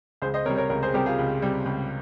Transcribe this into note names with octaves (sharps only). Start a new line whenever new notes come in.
C#2 G#4 C5
C5 D#5
C3 G3 A#4 C#5
A#4 C#5
C#2 A#4 C#5
G#4 C5
C3 G3 G4 A#4
F4 G#4
C#2
C3 G3
C#2